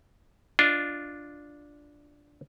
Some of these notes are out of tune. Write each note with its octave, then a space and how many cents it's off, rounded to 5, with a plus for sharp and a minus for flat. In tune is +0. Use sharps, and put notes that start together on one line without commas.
D4 -5 F4 +0 D#5 +0